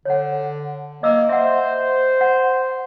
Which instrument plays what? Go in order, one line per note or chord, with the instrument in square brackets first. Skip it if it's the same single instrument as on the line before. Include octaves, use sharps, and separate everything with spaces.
[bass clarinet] D3 [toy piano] C#5 F#5
[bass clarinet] A#3 [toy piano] D#5 D6 E6
[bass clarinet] C5 [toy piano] E5 F#5
[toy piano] F#5